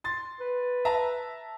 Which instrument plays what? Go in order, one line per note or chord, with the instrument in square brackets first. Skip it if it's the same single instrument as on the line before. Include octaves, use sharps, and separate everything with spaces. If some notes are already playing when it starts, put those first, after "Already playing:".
[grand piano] C6 A6
[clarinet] B4
[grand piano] E5 A5 A#5